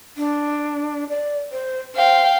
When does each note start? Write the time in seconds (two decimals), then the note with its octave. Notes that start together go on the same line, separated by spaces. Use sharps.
0.17 D4
1.09 D5
1.52 C5
1.95 C5 F5 G5